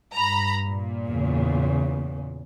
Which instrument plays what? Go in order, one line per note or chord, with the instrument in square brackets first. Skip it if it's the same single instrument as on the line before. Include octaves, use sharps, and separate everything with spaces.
[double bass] G2 [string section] A#5 B5
[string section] A#2
[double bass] E2 C#3